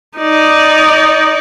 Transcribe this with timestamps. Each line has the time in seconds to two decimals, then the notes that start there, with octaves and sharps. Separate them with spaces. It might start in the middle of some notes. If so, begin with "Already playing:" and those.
0.18 D#4 D5